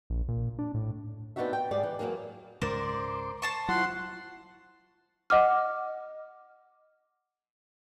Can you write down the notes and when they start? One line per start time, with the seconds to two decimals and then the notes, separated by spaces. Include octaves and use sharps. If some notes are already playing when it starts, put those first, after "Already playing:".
0.10 A#1
0.28 A#2
0.59 D4
0.74 A2
1.36 B3 C4 D4 D#4 F#4 E5
1.53 G5
1.71 G#2 G3 G#4 D5
1.83 E3
1.99 E2 F3 F#3 A#3 G#4
2.62 C#2 G#2 A#4 C5 D5 C6 D6
3.42 C5 A5 C#6
3.69 F#3 E4 F4 F#5 C6
5.30 D#5 F#5 D6 F6